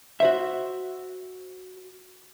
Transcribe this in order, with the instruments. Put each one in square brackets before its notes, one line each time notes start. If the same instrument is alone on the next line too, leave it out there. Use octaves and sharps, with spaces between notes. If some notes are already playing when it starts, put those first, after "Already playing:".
[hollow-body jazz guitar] F#4 C5 E5